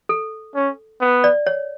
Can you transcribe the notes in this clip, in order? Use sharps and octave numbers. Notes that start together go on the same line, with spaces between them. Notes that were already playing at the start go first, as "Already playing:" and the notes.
A4
C#4
B3
D5
C#5